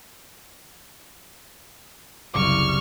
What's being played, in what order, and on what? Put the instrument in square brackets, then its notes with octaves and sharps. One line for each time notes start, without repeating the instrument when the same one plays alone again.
[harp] F#1 C2 D6 [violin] C#6 F6